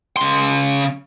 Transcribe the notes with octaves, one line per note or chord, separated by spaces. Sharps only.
C#3 C6